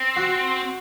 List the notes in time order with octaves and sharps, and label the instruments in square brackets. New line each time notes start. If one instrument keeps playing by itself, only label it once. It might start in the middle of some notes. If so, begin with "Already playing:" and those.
Already playing: [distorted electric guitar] C4
[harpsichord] F#4